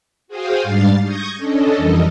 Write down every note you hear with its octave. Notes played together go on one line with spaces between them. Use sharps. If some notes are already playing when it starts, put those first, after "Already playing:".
F#4 G#4 C5 F5 G5 D#6
G#2 G3 D4 F5 A6 C7
C#6 D#6 G6 G#6 A#6
C#4 D4 A4 D#5
F2 E3 G3 A4 A#4 D#5